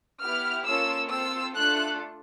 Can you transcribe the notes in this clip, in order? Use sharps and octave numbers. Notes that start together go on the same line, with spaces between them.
B3 E4 G4 F6
A#3 C#4 F4 A4 E6
C4 F4 A4 E6
A3 D4 F4 A4 F#6